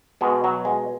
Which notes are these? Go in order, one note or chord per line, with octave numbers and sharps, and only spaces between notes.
B2 G#3
F#3
G#3